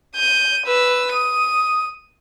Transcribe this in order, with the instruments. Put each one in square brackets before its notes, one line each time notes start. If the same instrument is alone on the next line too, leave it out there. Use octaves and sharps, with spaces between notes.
[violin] G6 D#7
B4 E6
[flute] D#6 [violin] D#7